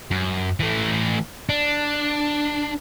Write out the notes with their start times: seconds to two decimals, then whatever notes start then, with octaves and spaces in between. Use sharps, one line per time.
0.11 F#2
0.60 E3 A3
1.49 D4